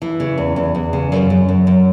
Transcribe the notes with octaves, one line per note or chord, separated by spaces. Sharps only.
E3
C#3
E2
E2
E2
C#3
F#2
F#2
F#2
F#2